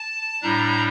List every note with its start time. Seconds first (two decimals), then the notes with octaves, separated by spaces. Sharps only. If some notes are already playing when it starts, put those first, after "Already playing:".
Already playing: A5
0.42 A2 G3 D4 A#5